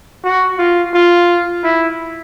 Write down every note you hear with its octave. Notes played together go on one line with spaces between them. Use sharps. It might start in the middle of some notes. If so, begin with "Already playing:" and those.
F#4
F4
F4
E4